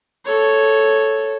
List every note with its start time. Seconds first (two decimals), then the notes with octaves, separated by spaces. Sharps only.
0.25 A4 C#5